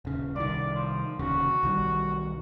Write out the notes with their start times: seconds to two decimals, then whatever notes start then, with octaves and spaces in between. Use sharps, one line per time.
0.05 D#1 C#3
0.36 C2 D#3 D5
0.75 F3
1.19 F1 D#2 C#3 F#4
1.63 B1 D#3 G3